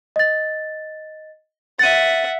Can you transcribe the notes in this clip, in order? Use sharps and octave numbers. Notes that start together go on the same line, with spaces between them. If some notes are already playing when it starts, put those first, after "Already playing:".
D#5 A6
E5 F#5 A6 D#7